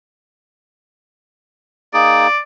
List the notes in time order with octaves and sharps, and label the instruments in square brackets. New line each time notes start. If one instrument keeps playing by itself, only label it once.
[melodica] A#3 D#4 G#4 [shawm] D5